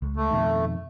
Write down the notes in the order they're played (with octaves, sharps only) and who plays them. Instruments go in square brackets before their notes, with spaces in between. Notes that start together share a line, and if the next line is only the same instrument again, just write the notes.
[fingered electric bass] C#2
[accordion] A3
[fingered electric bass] F2 B2 D#3